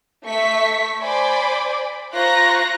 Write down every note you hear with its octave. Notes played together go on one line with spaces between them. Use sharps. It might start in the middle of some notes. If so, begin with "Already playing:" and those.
A3 E5 C#6 B6
C5 D5 G#5 B5 D6
F4 C5 A#5 C#6 F#6 A#6